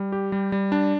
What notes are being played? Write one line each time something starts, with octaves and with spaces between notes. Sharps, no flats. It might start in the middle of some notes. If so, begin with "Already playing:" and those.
Already playing: G3
G4
G3
G3
D4